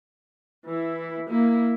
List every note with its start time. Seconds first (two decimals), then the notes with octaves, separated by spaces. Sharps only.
0.65 E3 E4
1.29 A#3 E4